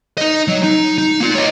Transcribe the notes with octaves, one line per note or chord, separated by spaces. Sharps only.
D#4 D#5
F#3
D#4
D#4
A#3 F4
C#5 D#5